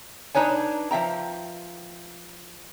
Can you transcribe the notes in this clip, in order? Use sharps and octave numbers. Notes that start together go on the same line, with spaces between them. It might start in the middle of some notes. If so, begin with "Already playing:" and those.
D4 D#4 B4 C#5 G#5
F3 E5 G5 A#5